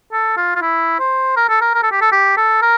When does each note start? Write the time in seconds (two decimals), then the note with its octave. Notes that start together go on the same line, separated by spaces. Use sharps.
0.13 A4
0.37 F4
0.56 F4
0.62 E4
0.99 C5
1.37 A#4
1.49 A4
1.61 A#4
1.75 A#4
1.83 A4
1.92 G4
2.01 A4
2.12 G4
2.37 A4
2.62 A#4